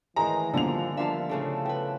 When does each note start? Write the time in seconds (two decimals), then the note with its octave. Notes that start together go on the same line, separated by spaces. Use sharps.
0.16 A2 D#3 E3 G#3 A#4 A#5
0.53 D3 F3 G3 A#3 B3 F7
0.97 F3 A#3 D4 E5 F5 A5
1.29 A2 C#3 D4 A4
1.65 E4 B4 G5